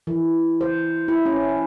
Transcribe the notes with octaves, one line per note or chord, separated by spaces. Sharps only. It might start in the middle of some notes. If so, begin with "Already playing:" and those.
E3
C5
E4
C#4